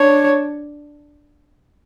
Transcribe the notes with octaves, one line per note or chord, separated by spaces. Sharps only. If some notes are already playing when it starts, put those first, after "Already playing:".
Already playing: D4 C#5